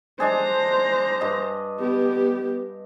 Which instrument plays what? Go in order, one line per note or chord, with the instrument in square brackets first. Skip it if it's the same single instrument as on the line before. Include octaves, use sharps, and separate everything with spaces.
[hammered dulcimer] G#3 D4 G#4 [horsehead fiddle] C5 A#5
[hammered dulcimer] G2 D#5
[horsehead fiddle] B3 G4